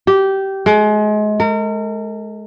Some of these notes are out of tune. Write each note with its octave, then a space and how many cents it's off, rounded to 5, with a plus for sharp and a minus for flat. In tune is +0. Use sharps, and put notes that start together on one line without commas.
G4 -15
G#3 +30
A#4 -35